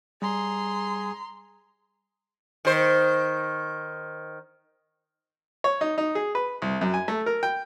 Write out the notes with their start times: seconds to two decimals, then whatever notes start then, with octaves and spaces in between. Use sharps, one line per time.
0.22 G3 G#4 A#5 C6
2.65 D#3 C5
5.64 C#5
5.81 D#4
5.98 D#4
6.15 G#4
6.35 B4
6.62 C2
6.81 F#2
6.94 G#5
7.08 A3
7.26 A#4
7.43 G5